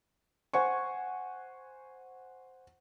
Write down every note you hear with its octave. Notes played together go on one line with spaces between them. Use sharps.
C5 F#5 G#5 C#6